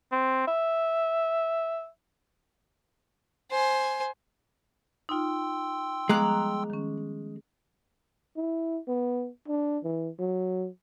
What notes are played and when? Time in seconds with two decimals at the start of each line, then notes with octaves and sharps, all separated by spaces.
0.12 C4
0.48 E5
3.51 C5 G#5
5.09 D#4 F4 G5 C6 E6
6.09 F3 G3 G#3 B3 A#5 D6 F#6
6.70 D#3 C#4
8.37 E4
8.88 B3
9.48 D4
9.84 E3
10.19 F#3